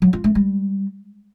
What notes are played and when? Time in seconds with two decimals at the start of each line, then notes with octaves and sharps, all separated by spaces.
0.02 F#3
0.13 F4
0.24 A3
0.35 G3